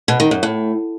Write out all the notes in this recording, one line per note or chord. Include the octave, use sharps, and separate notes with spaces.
B2
D#3
F#2
A2